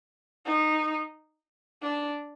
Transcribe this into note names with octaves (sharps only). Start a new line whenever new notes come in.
D#4
D4